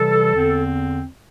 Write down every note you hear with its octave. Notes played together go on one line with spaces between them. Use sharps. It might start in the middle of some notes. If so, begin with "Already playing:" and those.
Already playing: C3 E3 G3 A4
E2 D3 C4